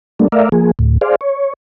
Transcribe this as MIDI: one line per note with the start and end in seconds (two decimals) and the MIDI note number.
0.19 0.28 55
0.19 0.28 57
0.19 0.28 58
0.19 0.28 62
0.32 0.49 57
0.32 0.49 70
0.32 0.49 74
0.32 0.49 76
0.32 0.49 77
0.52 0.71 53
0.52 0.71 58
0.52 0.71 68
0.79 0.98 38
0.79 0.98 45
1.01 1.16 68
1.01 1.16 72
1.01 1.16 74
1.01 1.16 77
1.21 1.53 73